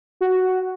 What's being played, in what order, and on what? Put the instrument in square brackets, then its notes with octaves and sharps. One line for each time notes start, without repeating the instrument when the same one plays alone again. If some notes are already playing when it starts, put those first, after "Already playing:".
[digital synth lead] F#4